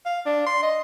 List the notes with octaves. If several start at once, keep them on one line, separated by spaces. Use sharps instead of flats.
F5
D4
C6
D#5